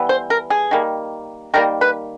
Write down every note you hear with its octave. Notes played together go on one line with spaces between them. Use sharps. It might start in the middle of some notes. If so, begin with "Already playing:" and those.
Already playing: E3 G3 B3
C5
A#4
G#4
D#3 G3 A#3
D#3 G3 A#3 A#4
B4